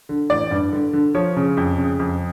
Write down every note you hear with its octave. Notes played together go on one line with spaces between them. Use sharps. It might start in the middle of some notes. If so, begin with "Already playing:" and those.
D3
A1 D5
G2
D3
D3
F3 C#5
C#3
F2
C#3
F2